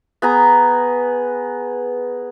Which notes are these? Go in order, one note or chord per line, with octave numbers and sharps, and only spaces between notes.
B3 G#4 A#5